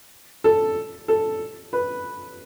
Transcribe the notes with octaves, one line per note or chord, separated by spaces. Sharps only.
A4
A4
B4